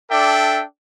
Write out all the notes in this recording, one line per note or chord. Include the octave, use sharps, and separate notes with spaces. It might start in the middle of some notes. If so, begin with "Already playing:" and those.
D4 A4 D5 E5 G5